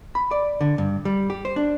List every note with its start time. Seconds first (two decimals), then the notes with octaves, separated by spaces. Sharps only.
0.15 B5
0.31 D5
0.61 D3
0.78 G2
1.05 G3
1.30 G4
1.45 C5
1.56 D4